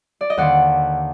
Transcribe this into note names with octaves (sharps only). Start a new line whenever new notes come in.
D5
D#5
D#2 D3 D5 F#5